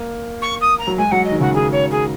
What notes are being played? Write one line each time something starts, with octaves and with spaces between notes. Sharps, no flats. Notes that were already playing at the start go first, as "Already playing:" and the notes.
Already playing: A#3
C#6
D#6
A#5
F#3
G#3 G#5
F#3 F#5
D#5
D#3
C#3 F#4
D#3 G#4
C#5
G#4